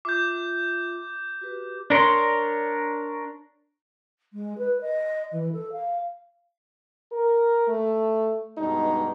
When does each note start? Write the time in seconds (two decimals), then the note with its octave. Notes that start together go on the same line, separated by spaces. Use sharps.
0.05 F4 E5 D6 G6
1.41 F#4 G4 B4
1.90 D4 A#4 C#5 C6
4.33 G#3
4.58 B4
4.81 D#5
5.32 E3
5.52 A4
5.72 F5
7.12 A#4
7.68 A3
8.58 G2 B2 G#3 D4 D#4